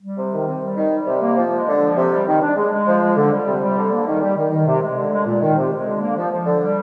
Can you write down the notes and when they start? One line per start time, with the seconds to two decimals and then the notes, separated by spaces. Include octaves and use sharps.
0.02 G3
0.17 C3
0.32 D#3
0.47 C3
0.61 G3
0.76 D#3
0.92 G3
1.07 C3
1.22 A#3
1.37 F3
1.52 G#3
1.67 D3
1.81 F3
1.96 C3
2.11 G3
2.27 D#3
2.42 D4
2.57 G#3
2.72 G#3
2.87 F3
3.02 G#3
3.16 D3
3.31 G3
3.46 C3
3.62 G3
3.77 D3
3.92 A#3
4.07 D#3
4.21 G3
4.37 D#3
4.51 D#3
4.67 C3
4.81 G#3
4.96 D3
5.11 G#3
5.26 A#2
5.41 D#3
5.57 C3
5.71 G#3
5.86 D3
6.01 A#3
6.16 F3
6.31 F3
6.46 D3
6.61 G3